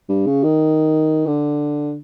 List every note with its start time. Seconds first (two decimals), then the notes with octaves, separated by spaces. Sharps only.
0.09 G2
0.26 C#3
0.43 D#3
1.27 D3